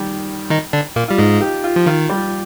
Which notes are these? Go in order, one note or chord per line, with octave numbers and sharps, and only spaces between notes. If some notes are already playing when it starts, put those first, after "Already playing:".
Already playing: D#3 G3
D#3 D#4
D3 D4
A#2 A#3
G3 F4
G#2 G#3 D#4
G4
F4
F3
D#3 F4
G3